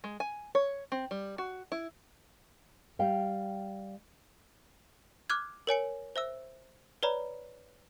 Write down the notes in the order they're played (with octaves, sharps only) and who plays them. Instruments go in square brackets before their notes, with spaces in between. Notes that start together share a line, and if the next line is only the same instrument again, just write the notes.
[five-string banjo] G#3
G#5
C#5
C4
G3
F#4
E4
[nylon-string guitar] G3 F5 G5
[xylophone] D6 F6 F#6 G#6
A#4 C#5 G#5 C#7
C5 E5 E6
B4 C#5 D5 A#5 B5